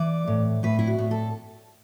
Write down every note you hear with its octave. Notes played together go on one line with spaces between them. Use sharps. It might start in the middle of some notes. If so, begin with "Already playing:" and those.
Already playing: E3 D5
A2
A2 B4
E4
F#4
A2
A4